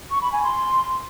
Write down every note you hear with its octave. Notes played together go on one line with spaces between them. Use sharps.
C#6
B5
G#5
C6